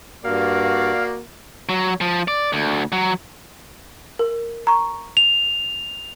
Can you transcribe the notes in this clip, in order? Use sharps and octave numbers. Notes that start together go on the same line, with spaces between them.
G2 A#3 F#4 D5 F5
F#3
F3
D5
D2
F#3
A#4
A#5 C#6
F7